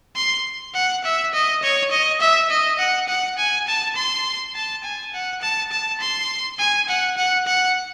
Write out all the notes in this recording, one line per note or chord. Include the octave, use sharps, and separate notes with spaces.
C6
F#5
E5
D#5
C#5
D#5
E5
D#5
F#5
F#5
G#5
A5
C6
A5
G#5
F#5
A5
A5
C6
G#5
F#5
F#5
F#5